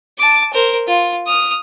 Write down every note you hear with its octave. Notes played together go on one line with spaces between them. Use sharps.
A5 D6
A#4 C5
F4
D#6 F6